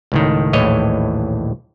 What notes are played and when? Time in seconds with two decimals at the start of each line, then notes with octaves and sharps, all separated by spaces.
0.12 C#2 A2 D#3
0.53 A#1 D#2 A2 E3 C#5 D#5